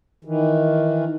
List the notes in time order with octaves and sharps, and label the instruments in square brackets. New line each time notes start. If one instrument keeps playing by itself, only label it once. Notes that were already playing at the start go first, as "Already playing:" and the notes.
[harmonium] D#3 E3